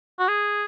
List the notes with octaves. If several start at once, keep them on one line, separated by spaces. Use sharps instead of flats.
F#4
G#4